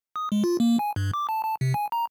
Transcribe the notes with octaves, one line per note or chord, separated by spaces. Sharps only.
D#6
G#3
F4
A#3
G#5
G2
D6
A5
A5
C3
G#5
A#5